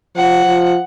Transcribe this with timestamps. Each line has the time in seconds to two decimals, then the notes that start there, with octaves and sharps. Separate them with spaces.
0.16 F3 F#5
0.45 F3